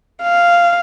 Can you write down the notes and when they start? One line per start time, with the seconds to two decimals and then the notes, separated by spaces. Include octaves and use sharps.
0.23 F5